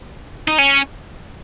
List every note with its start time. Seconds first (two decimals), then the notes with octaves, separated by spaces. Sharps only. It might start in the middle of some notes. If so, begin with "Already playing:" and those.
0.48 D#4
0.58 C#4